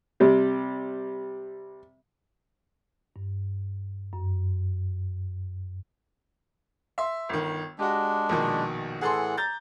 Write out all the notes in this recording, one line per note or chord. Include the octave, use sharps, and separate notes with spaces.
C3 G3
G2
F#2
E5 C6
G1 D#3
G#3 D4 F#4 G4
A#1 B2 D#3
A2 E3 G#4 A4 F#5 C6
A#5 G6 A6